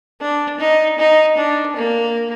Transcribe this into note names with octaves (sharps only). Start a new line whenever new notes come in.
D4
D#4
D#4
D4
A#3